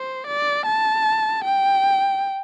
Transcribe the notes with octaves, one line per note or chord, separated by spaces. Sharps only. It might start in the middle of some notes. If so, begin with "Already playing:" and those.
Already playing: C5
D5
A5
G5